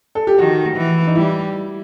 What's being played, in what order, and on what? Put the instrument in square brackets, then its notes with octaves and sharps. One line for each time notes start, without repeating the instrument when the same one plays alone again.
[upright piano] A4
G4
[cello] D#3 [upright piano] F#4
[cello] E3
[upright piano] D#4
[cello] G3 [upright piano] E4